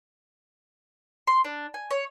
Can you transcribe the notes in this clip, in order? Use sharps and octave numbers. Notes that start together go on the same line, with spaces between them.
C6
D4
G#5
C#5